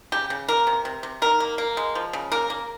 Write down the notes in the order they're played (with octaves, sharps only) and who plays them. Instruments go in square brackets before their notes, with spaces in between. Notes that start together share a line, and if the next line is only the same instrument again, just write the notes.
[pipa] C#3 G4
C#3
A#3 A#4
C3
C3
C3
D#3 A#4
A#3
A#3
G#3
F3
C#3
A#3 A#4
A#3